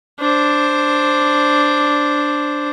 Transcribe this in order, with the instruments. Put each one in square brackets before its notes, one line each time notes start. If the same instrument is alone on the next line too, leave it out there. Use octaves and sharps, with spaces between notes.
[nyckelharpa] D4 C5